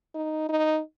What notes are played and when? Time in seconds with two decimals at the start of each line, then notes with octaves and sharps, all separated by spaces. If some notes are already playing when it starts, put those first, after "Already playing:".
0.15 D#4
0.49 D#4